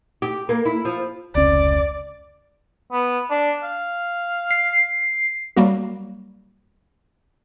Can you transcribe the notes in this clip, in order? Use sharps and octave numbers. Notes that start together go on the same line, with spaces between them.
G4
A#3
E4
F3
F1 C#2 C#4 D5
B3
D4
F5
C7
F#3 G3 A#3 F#4